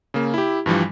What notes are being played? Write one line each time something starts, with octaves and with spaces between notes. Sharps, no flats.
C#3 A#3
E4 G4
G2 E3 F3 G3